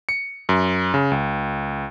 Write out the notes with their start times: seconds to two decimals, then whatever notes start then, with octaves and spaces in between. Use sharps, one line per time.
0.09 C#7
0.49 F#2
0.94 C#3
1.11 C#2